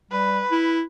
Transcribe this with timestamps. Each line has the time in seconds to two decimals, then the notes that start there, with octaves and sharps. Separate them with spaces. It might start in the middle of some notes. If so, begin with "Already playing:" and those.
0.11 G3 B4
0.52 E4